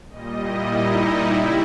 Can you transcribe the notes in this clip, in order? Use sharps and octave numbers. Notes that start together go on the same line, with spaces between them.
A#2 G3 D#5
E4
D#4
E4
C#3 G3 E4